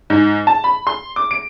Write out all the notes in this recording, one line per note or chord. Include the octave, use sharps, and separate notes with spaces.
G#2
A5
B5
C6
D6
D7